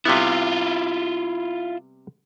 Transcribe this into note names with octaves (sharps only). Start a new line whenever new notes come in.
C3 G3 B3 E4 F4